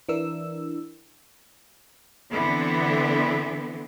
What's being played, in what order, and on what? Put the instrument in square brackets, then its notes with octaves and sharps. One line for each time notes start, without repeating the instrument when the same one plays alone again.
[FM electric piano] E3 D4 A#4 E6
[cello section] D3 E3 B3 C4